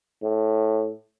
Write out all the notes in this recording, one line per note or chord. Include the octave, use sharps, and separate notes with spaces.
A2